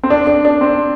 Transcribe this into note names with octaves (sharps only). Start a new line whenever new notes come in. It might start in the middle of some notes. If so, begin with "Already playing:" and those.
C4
D4
D4
D4
C4